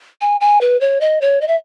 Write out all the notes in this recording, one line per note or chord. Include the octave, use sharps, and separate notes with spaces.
G#5
G#5
B4
C#5
D#5
C#5
D#5
E5